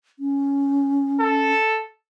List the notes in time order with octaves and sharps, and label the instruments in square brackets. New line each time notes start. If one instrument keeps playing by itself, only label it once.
[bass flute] C#4
[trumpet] A4